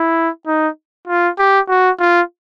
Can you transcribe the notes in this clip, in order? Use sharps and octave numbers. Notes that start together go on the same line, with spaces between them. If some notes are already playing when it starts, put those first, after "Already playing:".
Already playing: E4
D#4
F4
G4
F#4
F4